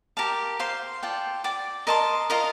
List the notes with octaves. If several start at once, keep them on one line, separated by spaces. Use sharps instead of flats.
G4 A#4 F5 A5
C5 F5 C6
F4 A4 D5 G5
D5 G5 D6
A#4 D#5 A5 C6
F4 A#4 D#5 A#5